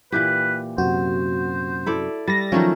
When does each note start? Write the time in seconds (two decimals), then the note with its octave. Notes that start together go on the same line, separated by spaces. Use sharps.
0.12 A#2 E3 G4 B4
0.78 F#2 C3 F#4 C5
1.86 E4 A4 D5
2.28 G3 A6 A#6
2.52 D#3 F3 F#3 A3 C#4 F4